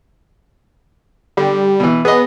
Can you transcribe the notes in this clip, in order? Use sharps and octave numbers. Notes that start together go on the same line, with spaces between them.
D3 G3
B2 E3
B3 G#4 D#5